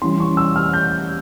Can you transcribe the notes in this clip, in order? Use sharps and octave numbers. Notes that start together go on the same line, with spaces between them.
E3 G3 C#4 E4 C6
C#6
E6
F6
G6